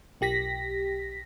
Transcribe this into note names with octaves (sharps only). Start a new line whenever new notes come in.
B1 G4 A#6 B6